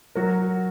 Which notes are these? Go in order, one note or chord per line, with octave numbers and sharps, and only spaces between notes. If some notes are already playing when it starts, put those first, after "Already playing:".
F#3 F#4 A#4